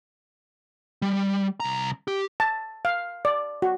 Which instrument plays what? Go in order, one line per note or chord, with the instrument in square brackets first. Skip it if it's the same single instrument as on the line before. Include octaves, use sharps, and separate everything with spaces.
[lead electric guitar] G3
C2 A#5
G4
[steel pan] A5
F5
D5
F#4